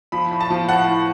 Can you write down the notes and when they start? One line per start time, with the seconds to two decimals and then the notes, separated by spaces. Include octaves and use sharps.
0.12 F3 B5
0.31 A2
0.41 A5
0.50 F3
0.68 A2 F#5
0.88 A2